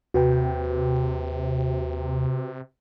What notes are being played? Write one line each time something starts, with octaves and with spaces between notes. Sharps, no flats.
D#2 C3 F#4 B4 G5